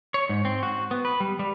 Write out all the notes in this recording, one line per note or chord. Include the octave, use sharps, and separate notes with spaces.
C#5
G#2
C4
F#4
B3
B4
G3
G3